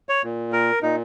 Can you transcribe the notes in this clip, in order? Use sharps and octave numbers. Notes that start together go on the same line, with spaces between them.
C#5
A#2
A#4
A#2 D#4